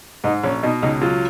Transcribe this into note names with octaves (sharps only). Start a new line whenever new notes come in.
G#2 D#4
A#1 C#4
B2 D#4
C#2 D#4
F#3 F4